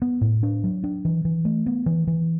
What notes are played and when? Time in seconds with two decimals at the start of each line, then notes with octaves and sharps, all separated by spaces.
0.02 B3
0.21 A2
0.43 D4
0.64 F#3
0.84 D4
1.05 E3
1.25 E3
1.45 A3
1.66 B3
1.86 E3
2.07 E3